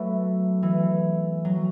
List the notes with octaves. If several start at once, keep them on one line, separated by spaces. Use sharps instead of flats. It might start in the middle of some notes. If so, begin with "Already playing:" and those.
Already playing: F#3 A3 B3
E3
F#3